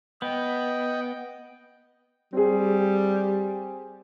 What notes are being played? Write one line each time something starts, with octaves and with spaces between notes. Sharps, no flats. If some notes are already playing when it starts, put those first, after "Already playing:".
B3 D#5 G5
G3 C4 G#4